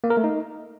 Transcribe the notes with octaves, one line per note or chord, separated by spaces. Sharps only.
A#3
A#4
A3
D#4